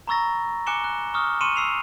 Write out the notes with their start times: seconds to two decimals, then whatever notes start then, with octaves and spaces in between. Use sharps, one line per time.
0.07 A#5 B5 C#6 E6 A6 A#6
0.66 G#5 D6 F#6 C#7 E7 G7
0.84 F#6
1.14 C#6 D#6 F6
1.41 C6 C#6 C#7 D#7 E7
1.56 E6 C7 F7